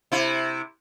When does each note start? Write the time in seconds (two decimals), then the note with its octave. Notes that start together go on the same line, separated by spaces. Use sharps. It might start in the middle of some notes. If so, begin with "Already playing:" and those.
0.12 C3 E4